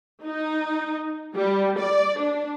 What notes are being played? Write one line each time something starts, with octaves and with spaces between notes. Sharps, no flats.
D#4
G3
D5
D4